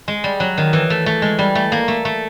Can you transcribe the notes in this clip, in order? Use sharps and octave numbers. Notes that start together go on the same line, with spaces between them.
G#3
G3
F#3
D#3
E3
A3
A3
G#3
G3
A3
A#3
A3
A3